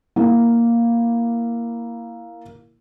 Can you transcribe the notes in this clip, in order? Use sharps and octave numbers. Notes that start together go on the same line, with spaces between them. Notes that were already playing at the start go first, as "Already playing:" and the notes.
A#3 E4